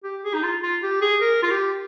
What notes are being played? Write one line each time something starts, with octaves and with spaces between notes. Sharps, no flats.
G4
G#4
D#4
F4
F4
G4
G#4
A#4
F4
G4